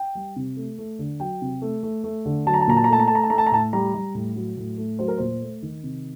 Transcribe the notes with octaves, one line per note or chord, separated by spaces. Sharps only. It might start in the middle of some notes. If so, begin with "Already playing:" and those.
Already playing: G5
G3
C3
A3
A3
D3
F#3 G5
C3
A3
A3
A3
D3
F#3 A5
A#5
A5
A#2 A#5
A5
A#5
A3 A5
A#5
A3 A5
A#5
A5
A3 A#5
A5
A#5
A2 A5
G3 A#5
G3
A2
F#3
A2
A3
F#3 C5
A#4
A#2 C5
A3
D#3
C3